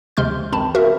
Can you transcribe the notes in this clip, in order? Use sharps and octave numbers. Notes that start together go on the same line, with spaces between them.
D2 C3 G#3 C6 F6 G6
A1 F#2 C4 A5 B5
F#4 A#4 E5 F5